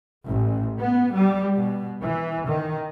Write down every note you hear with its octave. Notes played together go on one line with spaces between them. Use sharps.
A1
B3
G3
B2
E3
D#3